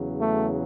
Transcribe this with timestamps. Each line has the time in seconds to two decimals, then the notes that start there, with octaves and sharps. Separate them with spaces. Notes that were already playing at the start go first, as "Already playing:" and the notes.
Already playing: E2 C#3 F#3
0.18 A3